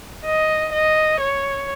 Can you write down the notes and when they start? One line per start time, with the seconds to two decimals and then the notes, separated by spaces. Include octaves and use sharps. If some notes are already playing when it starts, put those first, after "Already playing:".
0.25 D#5
0.73 D#5
1.21 C#5